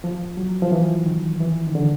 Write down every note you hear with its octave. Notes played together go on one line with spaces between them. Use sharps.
F3
F#3
F3
E3
D#3
E3
D#3
D3